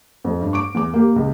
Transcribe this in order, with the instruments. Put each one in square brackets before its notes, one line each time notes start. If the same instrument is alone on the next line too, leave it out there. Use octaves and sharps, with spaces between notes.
[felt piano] F2
G2
C#6 D6 D7
E2 D6
A#3 G4
C#2